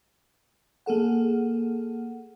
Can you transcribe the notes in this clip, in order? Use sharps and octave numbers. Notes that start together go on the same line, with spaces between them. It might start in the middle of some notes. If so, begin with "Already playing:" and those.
A#3 G#4 A4 F#5